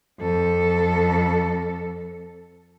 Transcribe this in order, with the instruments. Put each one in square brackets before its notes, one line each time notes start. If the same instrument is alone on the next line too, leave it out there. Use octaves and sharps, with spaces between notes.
[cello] F2 A4